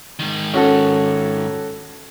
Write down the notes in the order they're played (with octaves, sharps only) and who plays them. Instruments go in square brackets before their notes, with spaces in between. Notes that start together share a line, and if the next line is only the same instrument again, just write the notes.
[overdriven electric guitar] G#2 D#3
[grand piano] C#4 F#4 A4